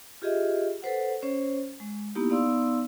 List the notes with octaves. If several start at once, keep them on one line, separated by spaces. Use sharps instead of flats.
F4 G4 G#4 D#5 E5
A4 B4 C5 F#5
C#4 C5 C#5
G#3
A#3 B3 D#4 E4 G4
B3 D#4 D5 F5 C6 E6